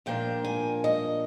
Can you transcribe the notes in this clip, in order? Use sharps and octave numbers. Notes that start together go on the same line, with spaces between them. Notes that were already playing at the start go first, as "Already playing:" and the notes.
A#2 F3 A#3 D4 G5
G#5
D#5